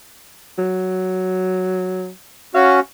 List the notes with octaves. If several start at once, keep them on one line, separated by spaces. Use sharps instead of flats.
F#3
C#4 F#4 F5